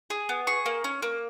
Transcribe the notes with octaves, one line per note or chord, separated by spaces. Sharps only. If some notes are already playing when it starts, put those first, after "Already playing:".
G#4
B3
G#4 C#6
A#3
C#4
A#3